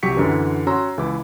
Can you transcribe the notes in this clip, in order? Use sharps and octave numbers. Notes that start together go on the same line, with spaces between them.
C2 F#3 G4 C#6 B6 C#7
F#2 D3 E3
C#4 F#4 C#5 A#5 C6 E6
C#2 E3 E4 D6